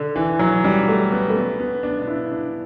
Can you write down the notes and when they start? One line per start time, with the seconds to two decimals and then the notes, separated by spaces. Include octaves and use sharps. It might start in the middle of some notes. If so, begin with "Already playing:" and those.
Already playing: D3
0.16 E3
0.39 F#3
0.64 G3
0.88 A3
1.12 B3
1.29 A3
1.36 B3
1.60 B3
1.83 D4
2.02 D4
2.08 E4
2.31 D4